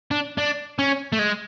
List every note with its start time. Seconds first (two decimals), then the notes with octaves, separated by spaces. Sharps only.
0.11 D4
0.38 D4
0.79 C#4
1.12 A3
1.19 G#3